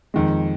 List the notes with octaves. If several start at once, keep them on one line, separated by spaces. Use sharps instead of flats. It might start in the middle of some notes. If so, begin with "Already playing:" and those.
F2 D#3 G#3